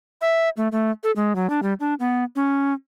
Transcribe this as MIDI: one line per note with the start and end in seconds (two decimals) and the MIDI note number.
0.21 0.49 76
0.57 0.68 57
0.72 0.91 57
1.03 1.11 69
1.16 1.36 56
1.36 1.50 54
1.50 1.60 62
1.63 1.73 55
1.80 1.94 62
2.00 2.24 59
2.36 2.73 61